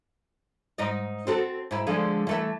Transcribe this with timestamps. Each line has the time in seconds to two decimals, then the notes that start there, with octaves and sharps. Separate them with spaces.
0.78 G#2 D#4 D#5
1.27 C4 F#4 A4
1.71 G#2 E4
1.87 D3 F3 G#3
2.27 E3 A3 E5